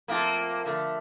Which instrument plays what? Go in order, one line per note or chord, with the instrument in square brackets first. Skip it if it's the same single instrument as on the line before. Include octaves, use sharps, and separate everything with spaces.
[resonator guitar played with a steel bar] F3 A3 C4 F4 A4 [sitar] A#3
[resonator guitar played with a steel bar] D3 F3 A3